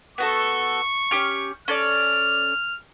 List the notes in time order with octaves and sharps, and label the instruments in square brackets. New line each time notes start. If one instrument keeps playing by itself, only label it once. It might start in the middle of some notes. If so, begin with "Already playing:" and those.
[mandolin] B3 F#4 A4 [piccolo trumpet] C#6
[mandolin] C#4 G4 F6
[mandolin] C#4 A4 D5 [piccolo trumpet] F6